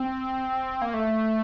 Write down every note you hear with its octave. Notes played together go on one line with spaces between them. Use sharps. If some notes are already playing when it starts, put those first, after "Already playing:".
Already playing: C4
A#3
A3